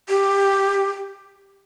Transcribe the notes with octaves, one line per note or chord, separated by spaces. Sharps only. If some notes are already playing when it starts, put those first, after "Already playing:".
G4